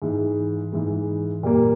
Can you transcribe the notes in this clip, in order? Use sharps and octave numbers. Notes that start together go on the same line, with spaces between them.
G#2 E3 G#3
G#2 E3 G#3
A#2 G3 A#3